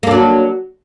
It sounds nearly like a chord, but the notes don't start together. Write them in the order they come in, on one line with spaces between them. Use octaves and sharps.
A#3 D4 F#3